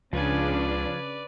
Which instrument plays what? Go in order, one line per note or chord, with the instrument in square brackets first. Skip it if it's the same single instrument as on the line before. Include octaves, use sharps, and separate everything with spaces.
[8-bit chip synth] C#2 [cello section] C#3 D4 [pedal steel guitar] F3 F4 G#5 [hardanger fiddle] B4 D5